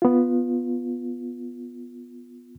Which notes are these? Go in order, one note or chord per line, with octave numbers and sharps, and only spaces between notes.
B3 F4